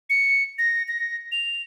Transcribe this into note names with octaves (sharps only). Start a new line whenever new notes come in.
C#7
A#6
A#6
F7